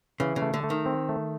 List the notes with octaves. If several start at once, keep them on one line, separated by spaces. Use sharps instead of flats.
C#3 E3
C#3
A3
D3
A3
D#3
C4
A3